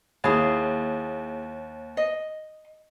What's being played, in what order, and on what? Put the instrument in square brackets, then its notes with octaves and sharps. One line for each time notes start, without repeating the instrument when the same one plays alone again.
[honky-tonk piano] D#2 [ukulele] E4 G#4
[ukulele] D#5